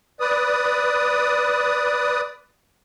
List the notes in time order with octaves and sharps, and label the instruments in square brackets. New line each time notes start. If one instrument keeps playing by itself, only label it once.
[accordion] B4 D5 D#6